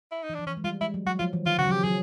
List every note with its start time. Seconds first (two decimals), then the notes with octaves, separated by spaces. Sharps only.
0.12 E4
0.24 D#4
0.29 E3
0.35 F3 D4
0.47 E3 C#4
0.57 G#3
0.64 G3 F4
0.81 G#3 E4
0.94 F#3
1.07 F#3 F#4
1.19 F3 F4
1.33 E3
1.46 D#3 F4
1.58 C#3 F#4
1.66 F#3
1.70 F3 G4
1.84 F#3 G#4